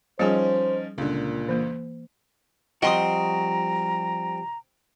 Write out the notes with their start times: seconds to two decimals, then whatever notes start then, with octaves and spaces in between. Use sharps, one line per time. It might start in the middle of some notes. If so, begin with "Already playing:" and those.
0.19 F3 G3 C#4 D#4 G#4 C5
0.98 C#2 A#2 D3
1.49 E3 A#3
2.82 F3 G3 C4 F#4 D#5 A#5 C6 D#6